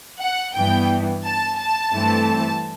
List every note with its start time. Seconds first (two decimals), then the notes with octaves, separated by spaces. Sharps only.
0.20 F#5
0.55 G2 E3 B3 G5
1.25 A5
1.59 A5
1.93 G2 E3 A3 C4